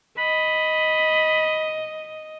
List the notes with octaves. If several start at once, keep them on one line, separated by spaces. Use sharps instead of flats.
D#5 B5